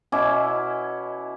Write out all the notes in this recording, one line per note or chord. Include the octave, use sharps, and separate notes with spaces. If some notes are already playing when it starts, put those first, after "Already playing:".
B2 C#4 E4 D6